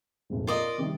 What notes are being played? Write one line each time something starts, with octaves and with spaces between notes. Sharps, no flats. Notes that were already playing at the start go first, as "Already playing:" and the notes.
F1 A#1 G#2
F4 A#4 D5 D#5
C3 D#3 G3